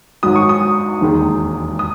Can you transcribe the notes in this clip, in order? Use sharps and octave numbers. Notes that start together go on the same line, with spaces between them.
G#1 G#2 F#3 D#6
C#6
D#6
E1 D#2 D#3 G#3
D#6